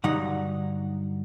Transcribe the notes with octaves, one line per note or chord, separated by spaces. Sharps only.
G2 D3 F#3 D#4 F#5